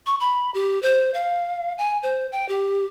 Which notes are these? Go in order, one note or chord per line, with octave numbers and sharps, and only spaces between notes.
C#6
B5
G4
C5
F5
G#5
C5
G5
G4